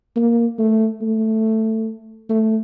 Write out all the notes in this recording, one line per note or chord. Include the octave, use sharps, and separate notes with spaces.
A#3
A3
A3
A3